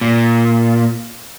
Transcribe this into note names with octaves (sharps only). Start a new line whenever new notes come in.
A#2